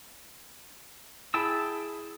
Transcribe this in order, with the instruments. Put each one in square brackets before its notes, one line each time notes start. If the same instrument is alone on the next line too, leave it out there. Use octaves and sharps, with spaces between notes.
[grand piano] E4 G#4 B5 [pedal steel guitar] G5 A5 E6